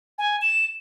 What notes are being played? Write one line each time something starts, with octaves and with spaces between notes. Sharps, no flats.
G#5
E7